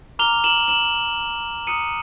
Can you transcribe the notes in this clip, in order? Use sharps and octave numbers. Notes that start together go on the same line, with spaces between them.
A#5 D6 F6 F7 G7
E7 F#7
E7 F#7
A#5 D#6 F#6 C#7 D#7